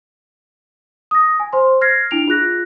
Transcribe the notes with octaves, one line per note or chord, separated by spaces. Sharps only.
D#6 A#6
G#5
C5 C6
F6 G#6 A#6 C7
D4 E4 D7 F7
F4 G#4 F#6 A#6